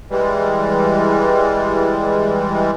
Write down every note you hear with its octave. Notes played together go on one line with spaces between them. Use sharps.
E3 G3 G#3